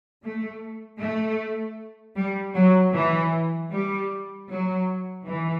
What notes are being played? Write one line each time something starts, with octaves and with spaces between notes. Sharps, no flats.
A3
A3
G3
F#3
E3
G3
F#3
E3